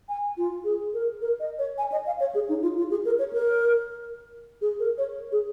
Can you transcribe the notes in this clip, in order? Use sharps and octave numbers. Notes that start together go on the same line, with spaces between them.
G#5
F4
G#4
A#4
A#4
D#5
C#5
G#5
D#5
F5
C#5
G#4
D#4
F4
F4
G#4
A#4
C#5
A#4
G#4
A#4
C#5
G#4